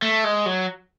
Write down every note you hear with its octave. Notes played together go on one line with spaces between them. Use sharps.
A3
G#3
F#3